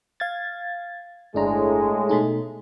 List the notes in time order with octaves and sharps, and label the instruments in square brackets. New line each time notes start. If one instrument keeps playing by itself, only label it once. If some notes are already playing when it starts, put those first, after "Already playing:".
[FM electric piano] F5 G#6 A6
[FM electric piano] G1 D4 A#5 [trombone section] A2 G#3
[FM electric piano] B2 A3 D#4